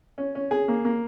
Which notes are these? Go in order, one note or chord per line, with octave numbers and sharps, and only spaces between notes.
C#4
C#4
G#4
A#3
A#3